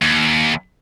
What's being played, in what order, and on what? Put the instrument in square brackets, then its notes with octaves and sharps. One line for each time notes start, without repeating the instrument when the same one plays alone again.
[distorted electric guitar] D#2